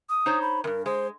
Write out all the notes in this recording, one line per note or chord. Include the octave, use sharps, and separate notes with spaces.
D#6
D#4 C5 C#5
B5
E2 G2 A#4
G#3 C5